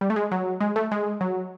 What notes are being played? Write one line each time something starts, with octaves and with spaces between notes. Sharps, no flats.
G3
A3
G#3
F#3
G#3
A3
G#3
F#3